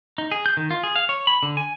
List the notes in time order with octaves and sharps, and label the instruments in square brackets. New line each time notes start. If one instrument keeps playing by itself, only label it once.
[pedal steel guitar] D#4
G#4
G6
D#3
F4
G#4
F5
C#5
B5
D3
G#5